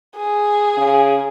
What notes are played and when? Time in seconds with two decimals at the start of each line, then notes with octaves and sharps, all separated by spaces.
0.16 G#4
0.78 C#3